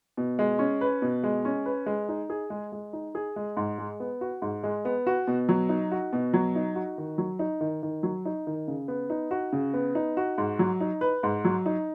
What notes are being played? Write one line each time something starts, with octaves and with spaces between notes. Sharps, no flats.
B2
G#3
C#4
B4
B2
G#3
C#4
B4
G#3
D#4
G#4
G#3
G#3
D#4
G#4
G#3
G#2
G#3
B3
F#4
G#2
G#3
B3
F#4
B2
F#3
D#4
F#4
B2
F#3
D#4
F#4
D#3
F#3
D#4
D#3
D#3
F#3
D#4
D#3
C#3
B3
D#4
F#4
C#3
B3
D#4
F#4
G#2
F#3
D#4
B4
G#2
F#3
D#4